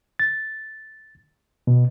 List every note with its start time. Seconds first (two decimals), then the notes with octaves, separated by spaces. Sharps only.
0.19 A6
1.67 B2